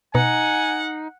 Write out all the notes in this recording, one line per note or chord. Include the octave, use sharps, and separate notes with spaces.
B2 D#4 F#5 G#5